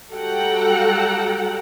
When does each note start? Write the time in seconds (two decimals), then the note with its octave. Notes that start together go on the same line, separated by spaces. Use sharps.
0.13 G3 F#4 A4 F#5 G5 A#5